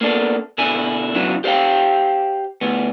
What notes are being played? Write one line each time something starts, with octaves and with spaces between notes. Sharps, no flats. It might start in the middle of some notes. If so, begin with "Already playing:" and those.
A#3 B3 D4 G#4 A4
B2 D3 E4 G#5
C#3 F#3 B3 D4 E4
G4 C5 C#5 F5 G5
D2 B3